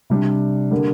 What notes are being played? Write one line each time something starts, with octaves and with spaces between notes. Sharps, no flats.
C3 G3 D4
D3 G3 A#3